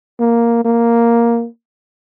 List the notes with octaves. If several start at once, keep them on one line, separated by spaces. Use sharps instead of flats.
A#3
A#3